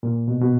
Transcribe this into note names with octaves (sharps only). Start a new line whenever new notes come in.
A#2
B2
B2